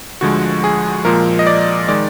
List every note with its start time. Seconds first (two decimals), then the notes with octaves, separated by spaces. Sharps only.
0.21 D2 D3 F3 G#3 F#4
0.64 G#4
1.05 A#2 F3 G#3 A#4
1.39 D#5
1.47 D5
1.88 D#3 G#3 D5